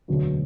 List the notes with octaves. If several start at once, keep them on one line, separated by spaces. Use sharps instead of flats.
E1 D2 D3 F#3 B3